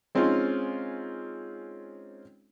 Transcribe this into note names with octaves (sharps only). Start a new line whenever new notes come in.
G#3 C4 C#4 D#4 F4